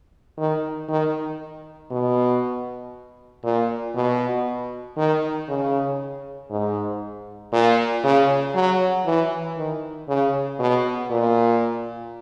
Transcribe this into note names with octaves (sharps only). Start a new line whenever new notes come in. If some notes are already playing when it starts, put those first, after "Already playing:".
D#3
D#3
B2
A#2
B2
D#3
C#3
G#2
A#2
C#3
F#3
E3
D#3
C#3
B2
A#2